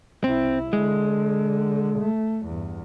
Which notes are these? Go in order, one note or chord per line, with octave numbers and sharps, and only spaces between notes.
C2 C4 E4
D3 G#3
A3
E2 G2